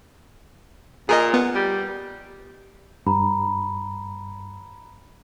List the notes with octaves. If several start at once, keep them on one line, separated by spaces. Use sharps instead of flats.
A#2 G#4 A#4 D#5
B3
G3
G2 A#5 B5